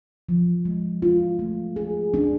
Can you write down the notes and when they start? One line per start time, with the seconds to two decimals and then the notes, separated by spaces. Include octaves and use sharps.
0.29 F3
0.65 G#3
1.02 F4
1.39 A3
1.76 G#4
2.14 D4